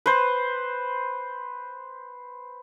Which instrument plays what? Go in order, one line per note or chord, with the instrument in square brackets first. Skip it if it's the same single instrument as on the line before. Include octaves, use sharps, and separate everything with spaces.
[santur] B4 C5